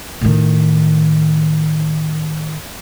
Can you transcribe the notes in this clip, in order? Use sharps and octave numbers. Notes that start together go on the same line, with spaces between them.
A2 D#3